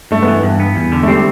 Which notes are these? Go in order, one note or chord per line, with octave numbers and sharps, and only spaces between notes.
G2 A3
B3
E3
G2
B3
E2
D3
A3
G3 C4